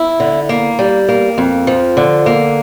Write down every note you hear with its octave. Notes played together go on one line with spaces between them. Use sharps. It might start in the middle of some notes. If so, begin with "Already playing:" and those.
Already playing: E4
D3
A#3
G3
A#3
F2
F3
D3
A#3